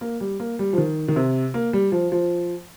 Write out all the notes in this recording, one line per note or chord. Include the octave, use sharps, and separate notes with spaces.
A#3
G3
A#3
G3
F3
D#3
D#3
C3
A#3
G3
F3
F3